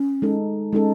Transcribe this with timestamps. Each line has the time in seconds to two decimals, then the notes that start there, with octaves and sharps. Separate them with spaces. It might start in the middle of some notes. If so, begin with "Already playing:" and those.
Already playing: C#4
0.22 G#3 D#4 A4
0.73 G#3 C#4 D#4 A4